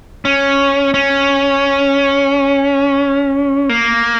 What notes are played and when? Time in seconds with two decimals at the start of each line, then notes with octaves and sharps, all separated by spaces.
0.25 C#4
0.94 C#4
3.69 A#3